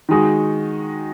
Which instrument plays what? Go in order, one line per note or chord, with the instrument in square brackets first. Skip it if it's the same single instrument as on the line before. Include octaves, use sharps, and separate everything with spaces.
[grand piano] D#3 G#3 D#4 F#4